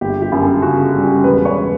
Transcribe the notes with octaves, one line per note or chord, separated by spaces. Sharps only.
G1 G4
G4
F#2
A4
C#3 F#4
G3
G4
E1 B4
C#5